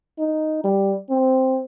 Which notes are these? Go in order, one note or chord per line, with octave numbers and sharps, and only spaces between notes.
D#4
G3
C4